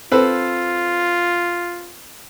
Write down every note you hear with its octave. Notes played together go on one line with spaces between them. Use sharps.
C4 F4 A4 B4